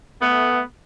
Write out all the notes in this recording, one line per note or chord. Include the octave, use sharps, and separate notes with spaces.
A3 B3